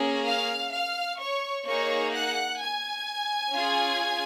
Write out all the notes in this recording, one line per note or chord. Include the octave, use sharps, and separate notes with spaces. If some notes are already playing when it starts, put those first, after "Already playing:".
Already playing: A#3 C#4 G#4
F5 F6
F5 F6
C#5 C#6
A#3 D#4 G#4 C#5 C#6
F#5 F#6
G#5 G#6
C#4 F4 G#4